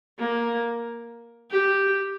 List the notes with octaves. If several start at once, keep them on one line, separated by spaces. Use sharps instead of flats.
A#3
G4